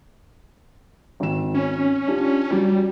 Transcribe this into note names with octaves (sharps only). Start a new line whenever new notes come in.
G#1 E7
C#4
D4 F4 G4
F#3 G3